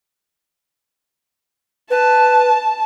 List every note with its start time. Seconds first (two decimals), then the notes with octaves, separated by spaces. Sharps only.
1.90 B4 A5